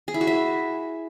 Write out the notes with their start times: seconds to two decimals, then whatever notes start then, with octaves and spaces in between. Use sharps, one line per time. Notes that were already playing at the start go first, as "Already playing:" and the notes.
0.08 G#4
0.14 E4
0.21 F#4
0.27 E5